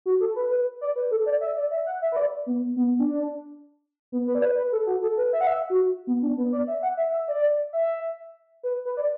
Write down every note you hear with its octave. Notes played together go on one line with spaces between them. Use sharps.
F#4
A4
B4
B4
D5
B4
A4
D5
E5
D5
E5
F#5
E5
B4
D5
B3
B3
D4
B3
B4
D5
B4
B4
A4
F#4
A4
B4
E5
F#5
E5
F#4
B3
D4
B3
D5
E5
F#5
E5
E5
D5
E5
B4
B4
D5